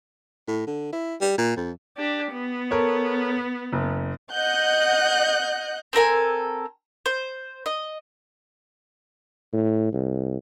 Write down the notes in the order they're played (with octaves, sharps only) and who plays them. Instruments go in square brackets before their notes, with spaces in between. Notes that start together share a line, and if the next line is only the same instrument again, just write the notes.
[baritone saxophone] A2
D3
E4
G3
A#2
F2
[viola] D4 G4
B3
[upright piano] A4 A#4 C#5
F#1
[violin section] D#5 F#5 F#6 G6
[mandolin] C4 A4 A#4 G#5
C5
D#5
[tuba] A2
C2